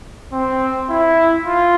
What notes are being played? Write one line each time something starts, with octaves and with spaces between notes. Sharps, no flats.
C4
E4
F4